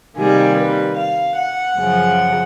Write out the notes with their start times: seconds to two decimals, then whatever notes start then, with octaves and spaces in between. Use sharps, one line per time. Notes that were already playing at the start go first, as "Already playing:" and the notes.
0.17 C3 D#3 G3 A#3 G#4
0.57 B4
0.98 F5
1.37 F#5
1.78 F#2 C#3 F3